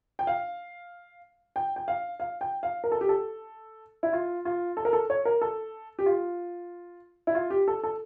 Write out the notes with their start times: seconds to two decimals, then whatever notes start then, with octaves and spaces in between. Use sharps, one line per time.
0.19 G5
0.27 F5
1.56 G5
1.76 G5
1.88 F5
2.20 F5
2.41 G5
2.63 F5
2.84 A#4
2.92 A4
3.01 G4
3.09 A4
4.03 E4
4.13 F4
4.45 F4
4.77 A4
4.85 A#4
4.93 A4
5.10 C#5
5.25 A#4
5.41 A4
5.99 G4
6.06 F4
7.27 E4
7.35 F4
7.50 G4
7.68 A4
7.84 A4